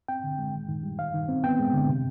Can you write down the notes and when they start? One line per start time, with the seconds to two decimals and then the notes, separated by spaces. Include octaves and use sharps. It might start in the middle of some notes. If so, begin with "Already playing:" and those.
0.08 C4 G5
0.24 D3
0.39 G#3
0.54 D#3
0.69 D#3
0.83 G3
0.99 D#3 F5
1.14 D#3
1.29 C4
1.44 B3 G5
1.59 G#3
1.73 D3
1.89 C3